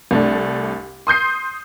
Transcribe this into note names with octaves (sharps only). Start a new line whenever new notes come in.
C2 A3 D4
C6 D#6 G6 C7